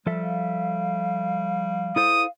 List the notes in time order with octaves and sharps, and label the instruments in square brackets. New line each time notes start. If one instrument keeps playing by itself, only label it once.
[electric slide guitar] F3 A4 E5 [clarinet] G3
[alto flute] F5
[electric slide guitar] E4 A4 C5 [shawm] D#6